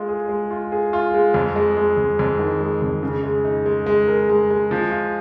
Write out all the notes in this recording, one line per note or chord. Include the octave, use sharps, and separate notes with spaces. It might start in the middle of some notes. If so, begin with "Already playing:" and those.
Already playing: G#3 F4
G#4
G#3
F4
G#4
F4
G#3
F2
G#3
G#3
F2
F2
D#3
G#3
F2
C#3
G#3
D#4
G#3
G#3
A#4
G#3
G#3
F3
F4